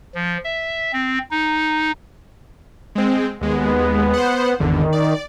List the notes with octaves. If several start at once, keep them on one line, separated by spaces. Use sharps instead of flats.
F3
E5
C4
D#4
G#3 C4
D#2 G#3 B3
C5 F#5
G#1 E2 D3 D#3
D5